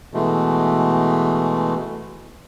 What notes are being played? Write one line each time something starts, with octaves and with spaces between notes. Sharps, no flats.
B2 E3 G#3 A3